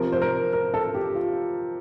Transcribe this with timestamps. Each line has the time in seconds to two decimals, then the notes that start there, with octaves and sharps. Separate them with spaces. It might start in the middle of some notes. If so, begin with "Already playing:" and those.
Already playing: C3 F3 A#4
0.12 C5
0.22 A#4
0.53 A#4
0.74 A4
0.95 G4
1.15 F4